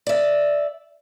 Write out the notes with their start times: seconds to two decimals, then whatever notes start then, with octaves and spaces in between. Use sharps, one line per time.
0.07 D5 E5